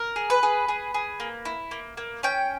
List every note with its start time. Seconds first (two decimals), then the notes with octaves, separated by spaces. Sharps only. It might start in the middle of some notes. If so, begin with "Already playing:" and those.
Already playing: A#4
0.16 G#4
0.30 B4
0.43 G#4
0.68 G#4
0.94 G#4
1.20 A#3
1.45 E4
1.71 A#3
1.97 A#3
2.23 C#4 G5